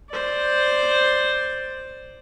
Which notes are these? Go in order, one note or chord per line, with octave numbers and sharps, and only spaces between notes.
C5 D5